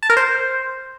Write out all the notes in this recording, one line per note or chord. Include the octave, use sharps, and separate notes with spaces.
A5
A#4
C5